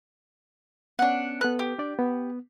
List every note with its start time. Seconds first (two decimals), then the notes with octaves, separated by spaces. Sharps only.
0.99 B3 C#4 D4 F#5
1.41 B3 A4 B4 F#6
1.59 G4
1.79 D4 D5
1.99 B3